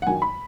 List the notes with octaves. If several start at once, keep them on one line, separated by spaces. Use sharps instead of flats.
F#5
F#2 D#3 F#3 G#5
B5